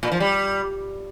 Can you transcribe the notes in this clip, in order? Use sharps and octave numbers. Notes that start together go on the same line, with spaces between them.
A#2
F3
G3